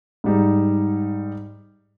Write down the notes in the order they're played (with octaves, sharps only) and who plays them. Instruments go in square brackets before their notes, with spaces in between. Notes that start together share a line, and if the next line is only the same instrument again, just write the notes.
[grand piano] G#2 G3 D#4